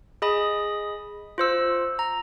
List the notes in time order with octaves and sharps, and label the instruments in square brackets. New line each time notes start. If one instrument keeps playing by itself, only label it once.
[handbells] G#4 D#5 B5 D#6
F4 C5 E6
A#5